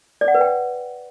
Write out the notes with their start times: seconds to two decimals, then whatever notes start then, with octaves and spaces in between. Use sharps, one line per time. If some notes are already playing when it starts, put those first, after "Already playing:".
0.21 D5
0.28 F#5
0.34 B4
0.41 G5